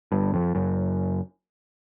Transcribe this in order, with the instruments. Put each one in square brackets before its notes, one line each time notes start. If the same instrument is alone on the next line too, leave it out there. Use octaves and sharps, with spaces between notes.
[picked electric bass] G1 G2
F2
F#1 F#2